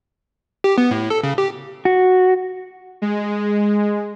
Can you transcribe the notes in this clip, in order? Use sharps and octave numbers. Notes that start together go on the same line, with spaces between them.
G4
B3
A2
A4
C#3
G4
F#4
G#3